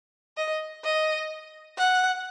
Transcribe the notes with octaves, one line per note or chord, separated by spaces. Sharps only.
D#5
D#5
F#5